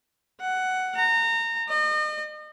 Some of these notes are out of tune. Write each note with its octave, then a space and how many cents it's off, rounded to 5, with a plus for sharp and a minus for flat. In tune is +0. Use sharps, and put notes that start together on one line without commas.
F#5 +10
A#5 -25
D#5 -40